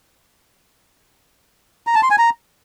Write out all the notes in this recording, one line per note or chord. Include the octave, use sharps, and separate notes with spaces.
A#5
A5
C6
G#5
A#5